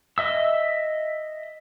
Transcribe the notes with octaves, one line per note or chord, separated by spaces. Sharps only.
D#5 E5 E6